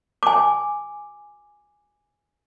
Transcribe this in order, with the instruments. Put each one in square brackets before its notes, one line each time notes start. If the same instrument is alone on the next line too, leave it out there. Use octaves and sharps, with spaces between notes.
[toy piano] G#5 D6